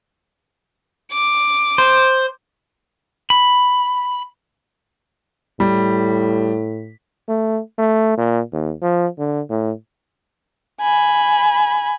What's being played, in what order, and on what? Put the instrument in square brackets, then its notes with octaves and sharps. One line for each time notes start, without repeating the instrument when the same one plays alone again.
[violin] D6
[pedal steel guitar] C5
B5
[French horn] A2 [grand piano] G3
[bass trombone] A3
A3
A#2
D#2
F3
D3
A2
[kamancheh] G#5 B5